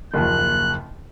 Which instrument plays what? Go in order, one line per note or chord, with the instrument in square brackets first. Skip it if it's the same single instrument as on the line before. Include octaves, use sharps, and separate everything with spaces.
[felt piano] F#1 D#2 F3 [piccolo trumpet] F#6